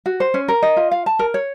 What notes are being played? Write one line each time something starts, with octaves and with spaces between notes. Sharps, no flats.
F#4
C5
C#4
A#4
D#5
F4
F5
A5
A#4
C#5